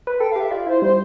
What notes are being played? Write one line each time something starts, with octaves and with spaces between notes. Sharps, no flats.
B4
A4 G5
F5
G4 E5
F4 D5
E4 C5
G3 C5